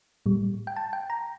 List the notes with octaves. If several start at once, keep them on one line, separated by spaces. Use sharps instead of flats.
A2 G3
G5
A5
G5
A#5